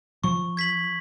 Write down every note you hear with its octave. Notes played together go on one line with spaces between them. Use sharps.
F3 C#6
G#6 B6 F#7